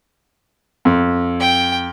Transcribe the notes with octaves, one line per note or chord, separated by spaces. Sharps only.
F2
G5